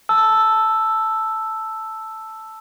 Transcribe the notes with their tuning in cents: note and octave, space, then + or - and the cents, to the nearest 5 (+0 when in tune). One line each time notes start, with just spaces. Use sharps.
A5 +0 E6 +0